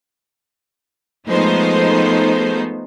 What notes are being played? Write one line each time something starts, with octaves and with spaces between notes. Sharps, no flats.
F3 G#3 A3 B3 D#4 C5